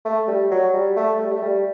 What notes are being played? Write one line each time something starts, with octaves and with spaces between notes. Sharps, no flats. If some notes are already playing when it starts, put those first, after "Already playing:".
A3
G3
F#3
G3
A3
G3
A3
G3